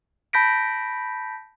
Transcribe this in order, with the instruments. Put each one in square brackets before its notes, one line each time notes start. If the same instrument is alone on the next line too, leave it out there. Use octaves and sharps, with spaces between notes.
[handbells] A5 B5 G6 A#6 B6 D7